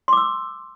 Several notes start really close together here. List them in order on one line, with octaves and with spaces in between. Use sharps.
C6 D6 E6